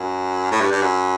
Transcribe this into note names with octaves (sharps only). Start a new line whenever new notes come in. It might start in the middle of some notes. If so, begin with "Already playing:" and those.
Already playing: F#2
A2
G2
G2
F#2